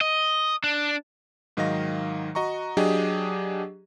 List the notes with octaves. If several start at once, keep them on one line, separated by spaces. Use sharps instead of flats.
D#5
D4
G#2 D#3 F#3 D#5 F5 A#6
F#4 D#5 A#5 C#6
F#3 D4 G4 G#4 D#5